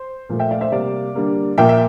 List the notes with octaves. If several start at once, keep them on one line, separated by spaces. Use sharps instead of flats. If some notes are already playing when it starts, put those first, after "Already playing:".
Already playing: C5
A#2 F3 A3
E5 G5
D5 F5
C5 E5
C3 G3 A#3 D5 F5
D3 G3 A#3
A#2 F3 A#3 E5 G5
E5